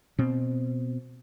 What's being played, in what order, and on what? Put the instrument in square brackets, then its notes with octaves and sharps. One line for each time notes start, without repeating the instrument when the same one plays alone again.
[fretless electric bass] B2 C4